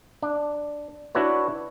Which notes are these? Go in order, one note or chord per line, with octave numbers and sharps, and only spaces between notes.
D4
D4 E4 F#4 B4 C#5